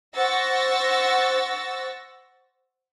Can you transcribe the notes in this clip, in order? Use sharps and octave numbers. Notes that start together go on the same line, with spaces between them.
C5 F#5 C#6 E6 A6 A#6